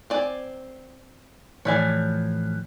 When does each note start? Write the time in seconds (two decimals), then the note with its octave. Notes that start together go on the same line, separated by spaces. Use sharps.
0.10 C4 D5 G#5
1.65 A2 E3 F3 C#5 D5 G#5